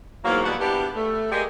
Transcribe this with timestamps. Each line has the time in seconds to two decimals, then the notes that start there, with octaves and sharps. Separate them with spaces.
0.24 E2 G#2 F#3 A#3
0.44 E2 B2 G3 F#4 F#5
0.59 B3 D4 E4 G4
0.95 A3
1.32 G#3 A#3 G4 G#4 D5 D#5